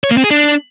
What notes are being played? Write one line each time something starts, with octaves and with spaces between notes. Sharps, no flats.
C#5
A#3
C4
G#4
D4